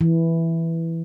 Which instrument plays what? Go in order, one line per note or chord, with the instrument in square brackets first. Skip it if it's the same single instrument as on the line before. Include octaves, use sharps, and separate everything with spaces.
[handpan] E3